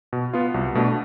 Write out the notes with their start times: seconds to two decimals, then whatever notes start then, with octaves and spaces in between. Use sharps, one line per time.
0.13 B2
0.33 B3 F4
0.54 C2
0.75 B2 A3 D4